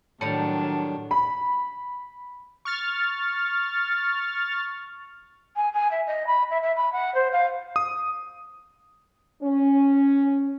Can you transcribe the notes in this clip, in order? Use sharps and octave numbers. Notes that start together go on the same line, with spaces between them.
A2 D#3 F#3 G3 D4 A5 C#7
B5
C#6 F6 A6
G#5
G#5
E5
D#5
B5
E5
E5
B5
F#5
C5
F5
D#6
C#4